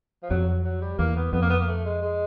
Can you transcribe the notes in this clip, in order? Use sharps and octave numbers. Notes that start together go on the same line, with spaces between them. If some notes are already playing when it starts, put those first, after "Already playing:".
F3
F2 F#3
F#3
F#3
G3
E2 A#3
B3
F2 B3
A#3
B3
A#3
A3
G#3
G#3